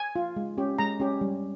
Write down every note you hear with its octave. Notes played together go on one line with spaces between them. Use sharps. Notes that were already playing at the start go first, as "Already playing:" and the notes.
Already playing: G#5
F4
G#3
C#4 G4
G#3 A#5
C#4 G4
G3